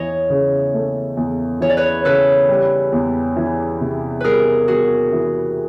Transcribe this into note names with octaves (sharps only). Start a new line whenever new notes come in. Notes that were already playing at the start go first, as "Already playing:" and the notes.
Already playing: E2 E3 C#5 D#5
C#3
A3
E2
E3 C#5
D5
B4 C#5
C#3 A4 B4
G3
E2
E3
C3
G3 G#4 A#4 B4
E2 F#4 G#4
E3